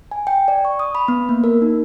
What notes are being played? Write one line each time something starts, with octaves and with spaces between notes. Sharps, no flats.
G#5
G5
D5
C#6
D#6
B5
B3
A#3
A#4
D#4